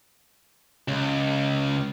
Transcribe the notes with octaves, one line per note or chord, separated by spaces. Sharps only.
C#2